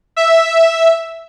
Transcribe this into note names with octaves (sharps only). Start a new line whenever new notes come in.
E5